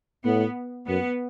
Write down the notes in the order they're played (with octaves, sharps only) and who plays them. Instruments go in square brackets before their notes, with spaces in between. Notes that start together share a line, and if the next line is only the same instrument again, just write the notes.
[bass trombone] A2 [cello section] B3
[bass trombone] F#2 [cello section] B3